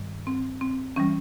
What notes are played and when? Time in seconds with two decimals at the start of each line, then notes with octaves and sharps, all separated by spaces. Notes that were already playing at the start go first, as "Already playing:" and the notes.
Already playing: G2 D#3 G3
0.27 C4
0.61 C4
0.96 E3 G3 C#4